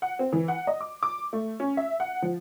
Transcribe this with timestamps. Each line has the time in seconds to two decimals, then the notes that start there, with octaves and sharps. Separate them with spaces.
0.02 F#5
0.19 C4
0.32 E3
0.48 F#5
0.67 D#5
0.81 D6
1.03 D6
1.33 A3
1.60 C#4
1.77 E5
2.00 F#5
2.22 F3